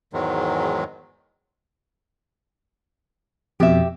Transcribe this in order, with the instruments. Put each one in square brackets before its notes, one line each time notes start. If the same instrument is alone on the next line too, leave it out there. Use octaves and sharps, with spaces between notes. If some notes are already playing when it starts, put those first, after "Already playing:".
[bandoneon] E2 G#2 D#3 F#3 G#3
[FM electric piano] F2 B2 [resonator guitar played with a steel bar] G4 E5